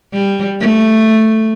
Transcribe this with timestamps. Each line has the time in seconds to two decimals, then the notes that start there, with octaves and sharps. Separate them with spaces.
0.13 G3
0.60 A3